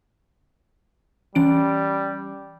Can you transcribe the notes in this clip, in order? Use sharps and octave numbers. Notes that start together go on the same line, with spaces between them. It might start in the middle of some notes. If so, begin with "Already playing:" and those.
E3 G3 C#4 D7